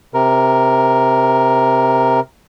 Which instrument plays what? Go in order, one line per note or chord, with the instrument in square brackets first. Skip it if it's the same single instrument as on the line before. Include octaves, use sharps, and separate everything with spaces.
[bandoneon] C3 A#4